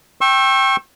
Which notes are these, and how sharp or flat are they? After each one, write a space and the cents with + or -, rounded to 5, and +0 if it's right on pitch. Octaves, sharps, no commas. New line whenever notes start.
G5 +0 C#6 -35 E6 +0